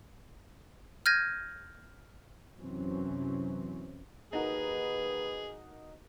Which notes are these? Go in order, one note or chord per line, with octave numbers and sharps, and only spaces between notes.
F6 G6 G#6 A#6 D#7
F#2 C3 E3 F#3 C4 C#4
D#2 D#4 F#4 G#4 A#4 B4